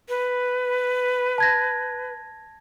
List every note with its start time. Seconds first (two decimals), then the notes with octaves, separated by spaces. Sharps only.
0.09 B4
1.38 A5 G#6 A#6